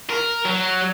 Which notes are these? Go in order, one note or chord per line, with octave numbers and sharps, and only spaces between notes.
A#4
F#3